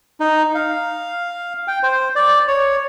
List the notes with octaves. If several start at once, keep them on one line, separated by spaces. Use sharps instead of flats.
D#4
F5
G5
C5
D5
C#5